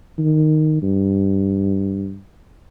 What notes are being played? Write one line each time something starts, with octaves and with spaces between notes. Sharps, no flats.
D#3
G2